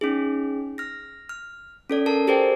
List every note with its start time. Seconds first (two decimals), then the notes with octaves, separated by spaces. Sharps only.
0.01 C#4 D#4 G#4
0.78 F6 A#6
1.29 F6
1.90 C#4 A4 D5
2.06 A4 A#4 A5
2.27 G4 G#4 A#4 C5 D5 G5